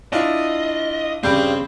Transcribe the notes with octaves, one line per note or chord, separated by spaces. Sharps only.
D4 E4 F4 D#5
G2 C#3 C4 B5 G6